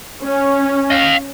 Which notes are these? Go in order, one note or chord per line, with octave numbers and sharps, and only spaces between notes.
C#4
D#5 F5